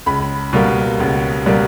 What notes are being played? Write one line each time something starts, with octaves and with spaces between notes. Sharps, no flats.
C#2 B5
B2 G3 A#3
C#2
B2 G3 A#3